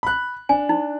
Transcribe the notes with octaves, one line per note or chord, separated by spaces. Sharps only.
B5 F#6
D4 G#5
D#4